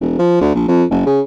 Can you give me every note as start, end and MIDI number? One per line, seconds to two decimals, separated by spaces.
0.01 0.18 28
0.19 0.40 53
0.41 0.52 38
0.55 0.66 34
0.68 0.84 41
0.90 1.03 30
1.06 1.21 49